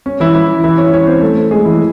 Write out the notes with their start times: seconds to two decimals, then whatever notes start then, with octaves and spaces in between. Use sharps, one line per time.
0.06 C#4
0.20 E3 E4
0.34 E3 E4
0.64 E3 E4
0.78 C#4 C#5
0.93 C#4 C#5
1.07 C4 C5
1.22 A3 A4
1.51 G#3 G#4
1.65 E3 E4